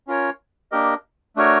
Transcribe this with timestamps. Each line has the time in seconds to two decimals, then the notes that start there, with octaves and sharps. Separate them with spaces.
0.07 C#4 F4 A#4 C#5
0.72 A#3 D4 G4 A#4 D#5
1.36 A3 D4 F#4 A#4 C#5